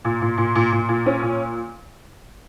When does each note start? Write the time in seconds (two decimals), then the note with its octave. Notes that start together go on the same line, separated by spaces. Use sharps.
0.05 A#2
0.22 A#2
0.38 A#2
0.55 A#2
0.72 A#2
0.89 A#2
1.06 C#4
1.22 A#2